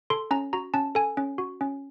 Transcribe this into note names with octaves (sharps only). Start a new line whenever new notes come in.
A4 C6
C#4 A#5
F#4 A#5
C#4 A5
A4 G#5
C#4
F#4
C#4